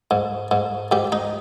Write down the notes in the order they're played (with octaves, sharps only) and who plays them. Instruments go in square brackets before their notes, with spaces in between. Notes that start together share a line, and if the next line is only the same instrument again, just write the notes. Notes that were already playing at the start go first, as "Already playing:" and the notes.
[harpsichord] G#2
G#2
G#2 G4
D#4